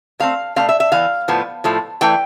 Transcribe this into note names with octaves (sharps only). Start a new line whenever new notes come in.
B2 A3 C4 F5
B2 A3 C4 F5
E5
E5
E3 B3 F5
A2 F3 B3
A2 F3 A3
E3 A3 G5